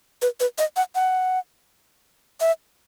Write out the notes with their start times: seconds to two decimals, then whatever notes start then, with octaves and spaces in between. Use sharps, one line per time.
0.22 B4
0.40 B4
0.58 D#5
0.76 F#5
0.95 F#5
2.40 E5